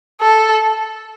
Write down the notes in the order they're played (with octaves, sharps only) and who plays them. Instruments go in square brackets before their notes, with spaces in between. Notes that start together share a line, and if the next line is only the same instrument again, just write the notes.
[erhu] A4